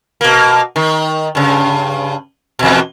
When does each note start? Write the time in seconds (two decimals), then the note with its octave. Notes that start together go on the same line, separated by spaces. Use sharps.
0.21 B2 A#3
0.76 D#3
1.35 G2 C#3
2.59 E2 B2